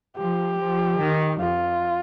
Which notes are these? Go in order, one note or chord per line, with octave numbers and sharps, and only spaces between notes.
F3 G4
F3
D#3
F2 F4